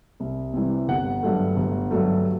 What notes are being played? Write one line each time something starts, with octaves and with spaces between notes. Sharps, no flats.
C2
C3 E3 G3
G1 F#5
G2 F#3 A3
G1
G2 F#3 A3